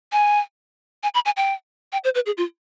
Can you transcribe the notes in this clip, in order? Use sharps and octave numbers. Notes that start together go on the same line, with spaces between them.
G#5
G#5
B5
G#5
G5
G5
C5
B4
G#4
F4